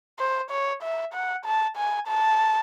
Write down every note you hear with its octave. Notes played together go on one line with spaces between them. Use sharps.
C5
C#5
E5
F#5
A5
G#5
A5